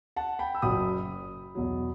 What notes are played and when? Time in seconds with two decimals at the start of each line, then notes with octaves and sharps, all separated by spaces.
0.16 F#5 A5
0.39 G5 B5
0.55 E6
0.62 F#1 F#2 F#3 B5 D#6
1.55 E2 B2 F#3